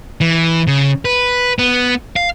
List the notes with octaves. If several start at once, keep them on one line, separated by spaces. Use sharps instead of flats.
E3
C#3
B4
B3
F5